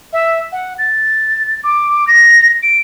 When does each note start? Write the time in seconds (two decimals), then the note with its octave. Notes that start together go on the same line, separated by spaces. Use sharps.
0.13 E5
0.52 F#5
0.79 A6
1.64 D6
2.07 A#6
2.63 D7